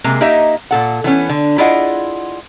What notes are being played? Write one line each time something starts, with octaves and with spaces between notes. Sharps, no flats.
C3 G#3 A#3
A#3 D#4 G4 D#5 E5
A#2 A4 F#5
E3 B3 C#4
D3
E4 F4 G#4 D5 D#5 F#5